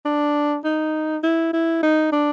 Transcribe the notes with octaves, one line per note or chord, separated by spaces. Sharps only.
D4
D#4
E4
E4
D#4
D4